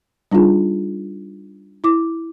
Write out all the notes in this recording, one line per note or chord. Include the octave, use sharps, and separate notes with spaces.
G3 D4 D#4 F4 G#4
E4 D6